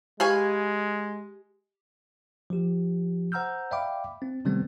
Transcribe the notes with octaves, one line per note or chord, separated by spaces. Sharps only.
G#3 G4 B4 F5 G#5 C#6
F3 G4
C5 F#5 A#5 E6 F6 G6
D5 E5 F5 G5 B5 D6
C4
C3 D#3 G3 A3 B3 C4